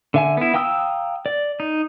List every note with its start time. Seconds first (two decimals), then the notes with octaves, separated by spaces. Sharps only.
0.14 D3 E5 G#5
0.37 B3 E4
0.54 F5 G5 A#5 D#6 E6
1.26 D5
1.60 D#4